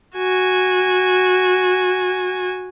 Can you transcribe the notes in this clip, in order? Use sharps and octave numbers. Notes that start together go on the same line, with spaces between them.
F#4 G#5